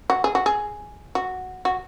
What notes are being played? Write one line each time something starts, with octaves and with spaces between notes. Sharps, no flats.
F#4
G#4
F#4
G#4
F#4
F#4